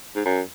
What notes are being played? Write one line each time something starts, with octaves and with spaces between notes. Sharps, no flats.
G#2
F#2